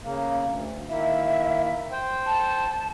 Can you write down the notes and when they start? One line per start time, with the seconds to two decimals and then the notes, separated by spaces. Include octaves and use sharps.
0.04 C#3 A#3
0.45 D2
0.89 D#3 A#3 E4 E5
1.92 C5 G5
2.27 A5